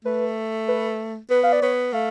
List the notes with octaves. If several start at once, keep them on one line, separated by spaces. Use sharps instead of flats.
A3 B4
B4
B3 B4
F5
D5
B3 C#5
A3 F5